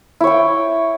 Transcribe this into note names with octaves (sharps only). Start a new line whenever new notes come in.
E4 C#5 G5